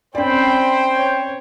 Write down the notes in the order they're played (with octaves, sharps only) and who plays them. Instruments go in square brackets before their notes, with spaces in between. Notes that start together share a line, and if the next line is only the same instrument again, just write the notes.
[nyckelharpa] C4 B5 [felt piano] C#4 D5 [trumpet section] C5 G5
[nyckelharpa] C#5